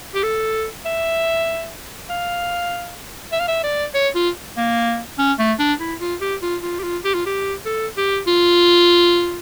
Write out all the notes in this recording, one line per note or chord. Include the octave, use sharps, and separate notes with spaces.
G4
A4
E5
F5
E5
F5
E5
D5
C#5
F4
A#3
C#4
A3
D4
E4
F4
G4
F4
F4
G4
F4
G4
F4
G4
A4
G4
F4